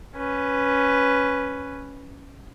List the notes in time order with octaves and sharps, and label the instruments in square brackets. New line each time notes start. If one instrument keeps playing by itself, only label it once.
[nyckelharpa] C#4 B4